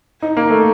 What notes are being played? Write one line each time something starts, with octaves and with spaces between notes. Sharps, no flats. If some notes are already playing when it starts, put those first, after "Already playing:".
D#4
A#3
A3